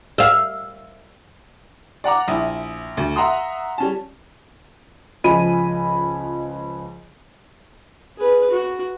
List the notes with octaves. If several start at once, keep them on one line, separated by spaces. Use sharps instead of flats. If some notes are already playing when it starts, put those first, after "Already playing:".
E5 F5
D5 F#5 A#5 D6
A#1 E4 D#6
D2
E5 F#5 A#5 C6 D#6
G3 C#4 A5
C#2 F3 D#5 G#5 B5 D#7
G#4 B4
F#4